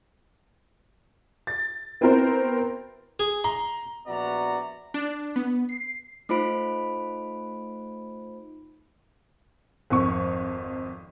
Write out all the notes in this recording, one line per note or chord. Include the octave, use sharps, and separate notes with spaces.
A6
B3 C4 E4 F#4 A#4 C5
G#4
A#5 C6
A#1 B3 F#4 D5 E5 A#5
D4
B3
C7
A3 D#4 F4 C5 B5 D7
G#1 F2 C#6